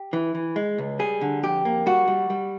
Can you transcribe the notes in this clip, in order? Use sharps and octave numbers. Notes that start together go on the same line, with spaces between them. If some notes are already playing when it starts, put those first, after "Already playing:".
Already playing: G4
E3
E3
G#3
C#2
G3 G#4
D3
F2 G4
A#3
G3 F#4
G3
G3